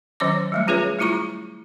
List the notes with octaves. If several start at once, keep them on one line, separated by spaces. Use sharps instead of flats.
D#3 F#3 C#4 C#5 D6
F#3 G3 A3
C#4 F4 G#4 B4 C#5
G3 A3 E4 F4 A#5 C#6